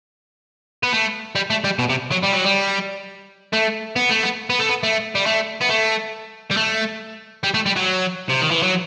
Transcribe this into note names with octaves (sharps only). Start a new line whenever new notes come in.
B3
A3
G3
A3
G3
B2
C3
F#3
G3
F#3
G3
A3
B3
A3
B3
B3
A3
B3
A3
G3
A3
B3
A3
G3
A3
G3
A3
G3
F#3
C3
D#3
E3
F#3